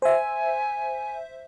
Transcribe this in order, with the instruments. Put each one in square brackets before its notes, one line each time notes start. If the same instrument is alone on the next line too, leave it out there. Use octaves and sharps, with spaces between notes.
[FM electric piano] C5 E5 [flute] G#5